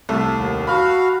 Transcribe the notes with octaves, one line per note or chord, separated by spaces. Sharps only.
C2 A3
D#2
F#4 F5 B5 F6